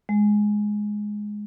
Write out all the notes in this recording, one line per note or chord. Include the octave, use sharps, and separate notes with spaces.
G#3